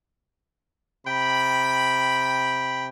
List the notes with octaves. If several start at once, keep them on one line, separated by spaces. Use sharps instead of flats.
C3 G5 B5